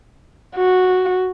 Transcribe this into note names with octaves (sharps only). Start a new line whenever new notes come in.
F#4